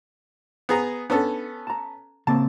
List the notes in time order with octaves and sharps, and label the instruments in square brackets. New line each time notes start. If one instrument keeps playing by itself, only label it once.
[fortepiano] B3 G#4 A#5
[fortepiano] B3 C#4 A4 [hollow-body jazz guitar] D4
[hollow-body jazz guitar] A5 A#5
[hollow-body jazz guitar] C#3 A#3 C4 [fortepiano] A5